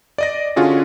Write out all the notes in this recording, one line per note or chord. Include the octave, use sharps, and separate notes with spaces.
D5 D#5 A#6
D3 C#4 F4 F#4 G#4